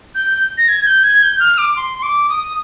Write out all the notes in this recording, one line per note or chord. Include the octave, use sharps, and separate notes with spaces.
G6
A#6
G#6
G6
G#6
G6
F6
D6
C6
C6
D6
D#6